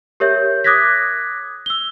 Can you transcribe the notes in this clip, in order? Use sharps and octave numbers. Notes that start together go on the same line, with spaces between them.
G4 A#4 C#5 E5 G6
D6 D#6 F#6 G#6 A#6 B6
E6 G7